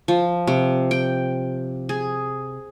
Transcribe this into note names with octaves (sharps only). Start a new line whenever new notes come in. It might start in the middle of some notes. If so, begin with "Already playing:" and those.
F3
C3
G5
G#4